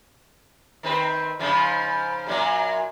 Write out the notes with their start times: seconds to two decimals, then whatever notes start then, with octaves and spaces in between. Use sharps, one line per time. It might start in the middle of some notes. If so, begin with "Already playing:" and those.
0.83 D#3 C4 B4
1.39 G#2 C#3 F3
2.27 F#2 A#2 F#3